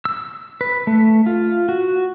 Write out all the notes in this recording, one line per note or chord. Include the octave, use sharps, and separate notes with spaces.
E6
B4
A3
F4
F#4